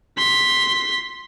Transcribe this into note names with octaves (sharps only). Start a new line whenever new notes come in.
C6 B6